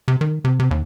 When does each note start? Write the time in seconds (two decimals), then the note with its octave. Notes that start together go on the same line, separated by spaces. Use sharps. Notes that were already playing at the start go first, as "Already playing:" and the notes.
0.08 C3
0.21 D#3
0.44 C3
0.59 C3
0.71 D#2